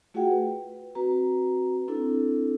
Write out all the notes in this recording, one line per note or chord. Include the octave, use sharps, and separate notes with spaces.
A3 F4 F#4 G#4 F#5 G5
B4
C4 F#4 B4 A#5
C4 D4 E4 A4